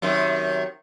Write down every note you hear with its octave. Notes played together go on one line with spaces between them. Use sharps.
F#2 C3 D#3